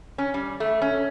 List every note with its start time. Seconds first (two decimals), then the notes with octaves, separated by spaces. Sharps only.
0.18 C#4
0.34 G3
0.60 A3
0.81 C#4